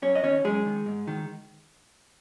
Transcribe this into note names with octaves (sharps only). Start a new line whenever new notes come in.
F#2 C#4 C#5
D#5
D#3 C#4 C#5
F#2 G#3 G#4
D#3
G#2
D#3